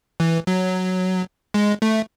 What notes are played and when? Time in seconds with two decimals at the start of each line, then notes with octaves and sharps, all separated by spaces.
0.20 E3
0.47 F#3
1.54 G#3
1.82 A3